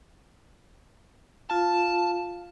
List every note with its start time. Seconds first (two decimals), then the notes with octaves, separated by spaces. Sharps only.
1.50 F4 F5 A5